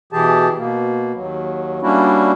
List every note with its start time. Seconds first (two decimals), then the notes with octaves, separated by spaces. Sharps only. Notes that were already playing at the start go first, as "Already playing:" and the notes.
0.13 B2 E3 G4 G#4 A5
0.58 B2 A#3
1.15 D#2 F#3
1.82 G3 A#3 C#4 D4 E4 F#4